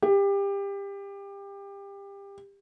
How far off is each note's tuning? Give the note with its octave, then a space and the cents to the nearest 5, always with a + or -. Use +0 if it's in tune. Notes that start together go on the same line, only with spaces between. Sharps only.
G4 +25